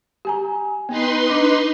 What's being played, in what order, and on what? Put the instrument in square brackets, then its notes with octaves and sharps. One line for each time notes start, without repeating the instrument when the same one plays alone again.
[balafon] G4 G#5 A#5
[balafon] B3 [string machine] D#4 B4 C6
[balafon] D4 D#5 D6